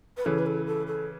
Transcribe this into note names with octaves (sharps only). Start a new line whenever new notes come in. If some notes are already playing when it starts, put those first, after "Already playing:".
B4
C#3 E3 A4
B4
A4
A4
A4